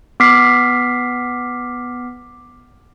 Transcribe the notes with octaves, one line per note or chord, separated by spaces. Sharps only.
B3 D6 F6 B6 C7